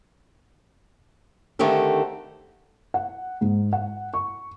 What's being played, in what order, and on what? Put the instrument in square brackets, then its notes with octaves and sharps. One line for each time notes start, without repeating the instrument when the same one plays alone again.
[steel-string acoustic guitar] D3 D#3 A3 C4 G4 A4
[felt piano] F#5
G#2
F#5
C#6